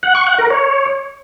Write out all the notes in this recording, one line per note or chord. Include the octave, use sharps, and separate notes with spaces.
F#5
C#6
F#5
A#4
C#5